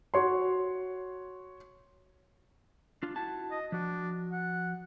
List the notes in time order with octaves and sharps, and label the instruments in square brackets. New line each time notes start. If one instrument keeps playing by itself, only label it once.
[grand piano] F#4 C#5 C6
[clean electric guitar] D4 F4
E4 F#4 A5
[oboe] D#5
[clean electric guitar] F3 F#4 [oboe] D4
[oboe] F#5